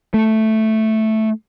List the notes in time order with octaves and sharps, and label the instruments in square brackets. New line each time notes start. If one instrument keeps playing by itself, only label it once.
[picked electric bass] A3